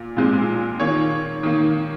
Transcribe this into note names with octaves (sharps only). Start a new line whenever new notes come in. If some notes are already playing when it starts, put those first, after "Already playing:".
Already playing: A#2
A#2 G#3 C4
D#3 A#3 C#5
D#3 A#3